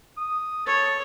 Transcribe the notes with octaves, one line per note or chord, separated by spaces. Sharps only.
D#6
A4 C#5